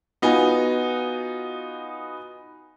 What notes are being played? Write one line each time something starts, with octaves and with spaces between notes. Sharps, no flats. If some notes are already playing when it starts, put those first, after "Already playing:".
B3 D#4 F4 F#4 G#5